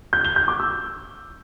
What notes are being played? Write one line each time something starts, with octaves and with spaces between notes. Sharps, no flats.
G6
G7
G6
D6
E6